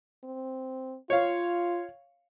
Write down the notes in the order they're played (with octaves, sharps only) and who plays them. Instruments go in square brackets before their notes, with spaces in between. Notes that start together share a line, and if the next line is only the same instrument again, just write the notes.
[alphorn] C4
[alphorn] F4 [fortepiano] C#5 F5